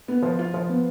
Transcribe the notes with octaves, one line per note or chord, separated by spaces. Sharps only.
B3
F3
F4
F3
B3